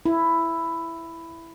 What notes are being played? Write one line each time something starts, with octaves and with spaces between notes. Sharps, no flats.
E4